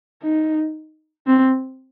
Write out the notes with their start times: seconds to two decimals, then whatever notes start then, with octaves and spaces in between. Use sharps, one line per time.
0.23 D#4
1.27 C4